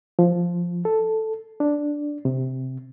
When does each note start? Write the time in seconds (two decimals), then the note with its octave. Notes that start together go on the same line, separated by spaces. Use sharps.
0.19 F3
0.85 A4
1.60 D4
2.25 C3